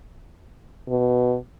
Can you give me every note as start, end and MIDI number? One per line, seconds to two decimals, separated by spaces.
0.88 1.36 47